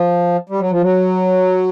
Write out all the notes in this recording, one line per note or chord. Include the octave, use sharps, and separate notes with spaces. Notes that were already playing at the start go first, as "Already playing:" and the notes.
Already playing: F3
G3
F#3
F3
F#3